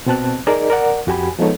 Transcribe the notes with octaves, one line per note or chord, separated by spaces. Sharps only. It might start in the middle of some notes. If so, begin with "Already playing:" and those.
B2 C4 A5 F#6
D#4 G#4 A#4 D5 D#5
A#4 D5 F#5
F2 F#4 G4 G#5 B5
F3 G#3 B3 D#4 A4 C#5